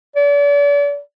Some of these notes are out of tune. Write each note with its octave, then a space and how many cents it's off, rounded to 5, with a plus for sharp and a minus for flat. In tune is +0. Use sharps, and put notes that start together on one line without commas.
D5 -40